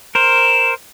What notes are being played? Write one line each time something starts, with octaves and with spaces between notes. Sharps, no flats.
A#4 C5 E7